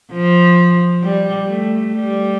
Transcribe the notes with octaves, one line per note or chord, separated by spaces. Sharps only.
F3
G3
A3
G3